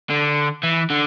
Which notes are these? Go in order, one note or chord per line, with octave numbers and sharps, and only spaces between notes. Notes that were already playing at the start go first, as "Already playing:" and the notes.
D3
E3
D3